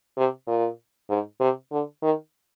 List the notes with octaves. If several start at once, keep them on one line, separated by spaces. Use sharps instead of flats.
C3
A#2
G#2
C3
D3
D#3